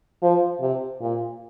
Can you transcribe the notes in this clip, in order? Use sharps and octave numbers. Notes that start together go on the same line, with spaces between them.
F3
C3
A#2